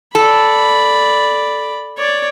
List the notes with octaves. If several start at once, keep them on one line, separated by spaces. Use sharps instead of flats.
A4 D5 B5
C#5 D5